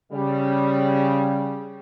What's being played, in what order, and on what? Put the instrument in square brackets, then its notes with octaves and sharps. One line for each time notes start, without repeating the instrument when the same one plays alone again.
[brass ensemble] C#3 G3